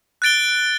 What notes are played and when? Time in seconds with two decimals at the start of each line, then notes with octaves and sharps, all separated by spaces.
0.22 F#6 A6 D7 G7